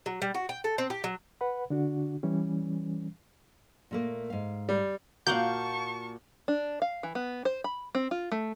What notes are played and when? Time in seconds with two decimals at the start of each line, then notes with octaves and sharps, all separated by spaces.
0.06 F#3
0.22 G3
0.35 F#4
0.49 G5
0.64 A4
0.78 C4
0.90 G4
1.04 F#3
1.41 B4 F#5 B5
1.70 D3 D4 F#4
2.23 E3 G3 C#4
3.91 A#2 A3 A#3
4.30 G#2 F5
4.69 G3
5.27 A#2 A#3 F#4 F5 F#5 A5 C#6 G6
6.48 D4
6.82 F5
7.03 E3
7.15 B3
7.45 C5
7.64 B5
7.95 C4
8.11 F4
8.32 A3